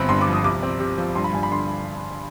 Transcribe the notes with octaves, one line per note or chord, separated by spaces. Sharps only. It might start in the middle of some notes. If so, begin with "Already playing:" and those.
Already playing: G1 B3 C4 B5
G2 C6
D6
F3
D#6
C2 D6
C4
C3
F3
G2 C6
B5
G2 G#5
B5
D3 C6